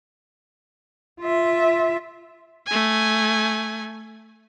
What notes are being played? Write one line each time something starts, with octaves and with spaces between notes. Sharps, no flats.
F4 E5
A3 G#5